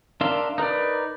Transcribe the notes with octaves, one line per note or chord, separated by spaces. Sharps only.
D4 A#4 E5 F5 C6
D#4 A#4 B4 D5